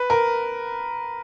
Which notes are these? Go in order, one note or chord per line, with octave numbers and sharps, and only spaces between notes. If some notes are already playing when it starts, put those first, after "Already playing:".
Already playing: B4
A#4